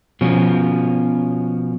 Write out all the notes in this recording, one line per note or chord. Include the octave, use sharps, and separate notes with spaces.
B2 F3 C#4